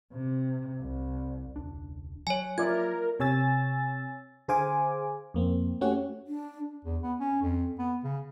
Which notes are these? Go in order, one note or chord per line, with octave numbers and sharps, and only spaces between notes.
C3
C2
E1 C#2 D4
F#3 C#5 G#5
F4 A#4 D5 E5 G#6
C3 C#5 G#5 E6 A6
D3 G#4 C5 F5 G#5 D6
F2 A#3 C4
A3 C#4 F#4 G4 C#5 F#5
D4
E2
B3
C#4
F2
B3
C#3